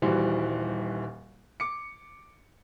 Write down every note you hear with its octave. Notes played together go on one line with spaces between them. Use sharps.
D#1 E3 G3 F#4 C5
D6 C#7